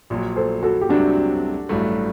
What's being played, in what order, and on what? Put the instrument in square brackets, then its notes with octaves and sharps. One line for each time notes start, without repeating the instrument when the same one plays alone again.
[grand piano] A#1 A#2 F#3
[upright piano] A4 C5
F#4 A4
G4
[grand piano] C2 C3 F#3 C4 [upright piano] D4 F#4
[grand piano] A1 G2 F#3 A3